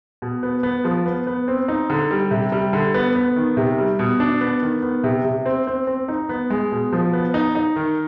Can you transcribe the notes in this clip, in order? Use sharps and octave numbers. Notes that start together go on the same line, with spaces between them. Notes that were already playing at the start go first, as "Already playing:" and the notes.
B2
B3
B3
F3
B3
B3
C4
D#4
D3
G3
C3
G3
D3
B3
B3
D#3
C3
G3
B2
D4
B3
D#3
B3
C3
C3
C4
C4
C4
D#4
B3
G#3
B2
F3
B3
D#4
D#4
D#3